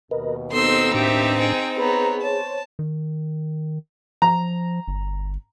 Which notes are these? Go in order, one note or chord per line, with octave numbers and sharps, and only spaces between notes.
D#2 B2 A#4 B4 D#5
B3 C4 D#4 A4 C5 C6 D#6 E6
A2 D4 G4 E5 A6
G#4 G5
B3 G#4 B4 C#5 A#5
C5 C#5 A5
D#3
F3 A#5
G1